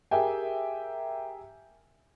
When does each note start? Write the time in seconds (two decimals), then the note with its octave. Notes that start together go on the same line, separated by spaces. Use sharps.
0.11 G4 G#4 A#4 E5 G5 G#5